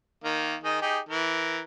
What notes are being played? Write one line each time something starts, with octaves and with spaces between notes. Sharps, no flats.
D#3 A#3
D#3 D#4 G#4
D#4 G4 G#4
E3 A#4